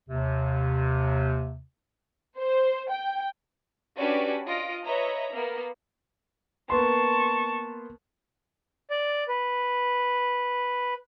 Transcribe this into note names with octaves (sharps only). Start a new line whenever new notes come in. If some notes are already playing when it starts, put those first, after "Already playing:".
D#2 C3
C5
G5
C#4 D4 F#4 G4 B4 D5
F4 D#5 A#6 D7
B4 C#5 D#5 E5 A#5
A#3 B3 A#4
A#3 B3 A5 C6 C#6
D5
B4